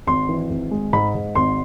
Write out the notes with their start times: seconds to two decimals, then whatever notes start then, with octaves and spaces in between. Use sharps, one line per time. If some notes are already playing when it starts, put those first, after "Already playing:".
0.07 G#1 C6
0.29 E3
0.50 G#1
0.71 G#3
0.93 G#2 B5
1.15 G#2
1.35 G#1 C6